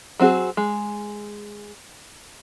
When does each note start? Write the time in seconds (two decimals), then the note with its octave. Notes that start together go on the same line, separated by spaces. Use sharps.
0.19 F#3 C4 F#4 G#4
0.57 G#3